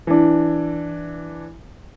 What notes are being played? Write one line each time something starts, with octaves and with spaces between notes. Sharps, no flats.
E3 D4